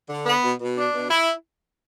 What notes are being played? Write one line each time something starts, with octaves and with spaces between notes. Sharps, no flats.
D3
B3
B2
B2
D4
B2
E4